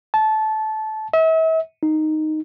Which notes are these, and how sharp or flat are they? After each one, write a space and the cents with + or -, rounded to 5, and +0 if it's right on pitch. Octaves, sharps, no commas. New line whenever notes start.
A5 -20
E5 -40
D#4 -5